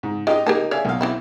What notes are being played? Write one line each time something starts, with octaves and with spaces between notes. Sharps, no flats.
G#2
G#3 D#4 F4 G4 D#5 F5
A#3 D#4 G4 G#4 A5
G#4 C#5 D5 E5 F5
B1 F5
E3 C4 E4